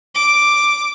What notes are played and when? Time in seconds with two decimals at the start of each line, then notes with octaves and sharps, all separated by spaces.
0.15 D6